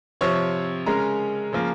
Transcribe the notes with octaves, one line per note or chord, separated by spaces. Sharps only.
C3 F3 C4 C#5 C#6
C#3 G#3 C#4 A#4 A#5
C#3 F3 A#3